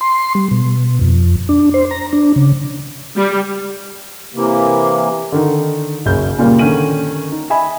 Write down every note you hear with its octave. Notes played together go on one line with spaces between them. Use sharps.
C6
G3
B2
F2
D4
C5
A#5
D4
C#3
G3
C3 E3 A#3
D3 D#3 D#4
F#1 F#2 C#3 G6
A#2 C#3 G3 A#3
D3 D#3 C#4 D#7 F#7
D#4
D#5 E5 G#5 B5